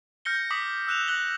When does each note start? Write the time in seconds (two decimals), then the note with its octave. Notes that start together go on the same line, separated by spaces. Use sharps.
0.25 F6 G6 A#6 C#7 G7
0.51 D6 D#6 B6
0.87 E6 F#6 E7 F7
1.08 F#6 A#6 F#7 G7